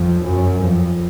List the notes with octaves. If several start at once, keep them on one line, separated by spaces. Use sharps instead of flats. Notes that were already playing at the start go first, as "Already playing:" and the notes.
Already playing: F2
F#2
F2